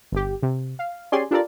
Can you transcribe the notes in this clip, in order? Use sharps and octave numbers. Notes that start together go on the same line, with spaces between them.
G1 G4
C3
F5
C#4 G4 G#4 D5 G#5 C6
D4 F4 G4 A4 A#4 D5